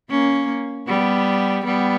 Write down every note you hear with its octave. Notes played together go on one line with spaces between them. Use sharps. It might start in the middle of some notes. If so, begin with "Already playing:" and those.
A#3 C#4
G3 B3
G3 B3